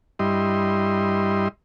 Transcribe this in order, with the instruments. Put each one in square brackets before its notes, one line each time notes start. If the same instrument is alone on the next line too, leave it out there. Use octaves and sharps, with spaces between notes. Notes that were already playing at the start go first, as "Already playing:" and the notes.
[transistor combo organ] G2 G3 E4 D#5 C6